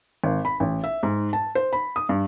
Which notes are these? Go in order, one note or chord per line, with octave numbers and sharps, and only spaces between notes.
G#1
B5
A1
E5
G#2
A5
C5
B5
D#6
G2